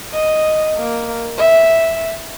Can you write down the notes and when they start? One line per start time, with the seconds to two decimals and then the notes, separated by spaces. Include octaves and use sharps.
0.13 D#5
0.76 A#3
1.38 E5